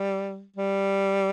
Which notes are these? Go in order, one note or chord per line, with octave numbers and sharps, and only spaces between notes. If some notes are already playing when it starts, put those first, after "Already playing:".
Already playing: G3
G3